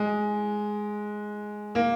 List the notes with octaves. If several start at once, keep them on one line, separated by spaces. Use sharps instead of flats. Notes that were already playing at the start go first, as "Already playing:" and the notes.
Already playing: G#3
A#3